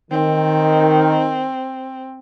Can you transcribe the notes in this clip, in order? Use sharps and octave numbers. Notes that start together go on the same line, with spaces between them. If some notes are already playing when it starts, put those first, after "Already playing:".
D#3 C4